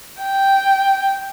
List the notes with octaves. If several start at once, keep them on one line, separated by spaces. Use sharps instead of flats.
G5